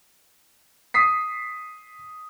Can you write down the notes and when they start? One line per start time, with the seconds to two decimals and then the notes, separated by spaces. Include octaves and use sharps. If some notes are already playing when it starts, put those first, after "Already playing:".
0.94 D#6 B6 C7